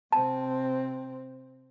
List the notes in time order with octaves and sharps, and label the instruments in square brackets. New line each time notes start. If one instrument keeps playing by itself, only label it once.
[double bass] C3 C4 [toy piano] A5